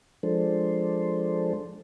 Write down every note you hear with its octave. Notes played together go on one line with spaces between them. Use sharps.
F3 G#3 D4 A4 C5